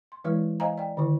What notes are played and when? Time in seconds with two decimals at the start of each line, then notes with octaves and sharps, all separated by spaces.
0.12 C6
0.24 E3 G#3 E4 B4 C#5
0.60 C5 D#5 F5 G#5 A#5
0.77 D5 G5
0.97 D3 D#3 E4